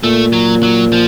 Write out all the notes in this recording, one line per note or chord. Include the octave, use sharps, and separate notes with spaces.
A#2 A3
F#3
F#3
F3